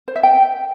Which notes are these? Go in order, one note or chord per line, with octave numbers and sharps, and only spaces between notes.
C5
E5
G5